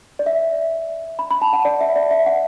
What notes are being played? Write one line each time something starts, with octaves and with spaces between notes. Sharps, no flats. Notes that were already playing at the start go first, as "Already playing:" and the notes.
D5
E5
B5
B5
A5
F#5
D5
E5
D5
E5
F#5